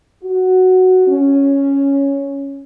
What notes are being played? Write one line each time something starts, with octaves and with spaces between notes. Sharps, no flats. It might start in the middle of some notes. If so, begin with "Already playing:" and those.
F#4
C#4